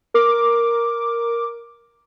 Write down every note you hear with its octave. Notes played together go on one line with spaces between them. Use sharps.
A#4 D6